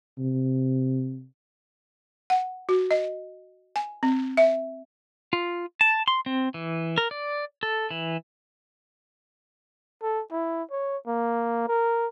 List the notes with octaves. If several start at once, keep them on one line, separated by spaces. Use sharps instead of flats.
C3
F#5
F#4
D#5
G#5
C4
E5
F4
A5
C6
C4
E3
A#4
D5
A4
E3
A4
E4
C#5
A#3
A#4